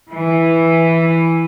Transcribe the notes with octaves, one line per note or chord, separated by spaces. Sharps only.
E3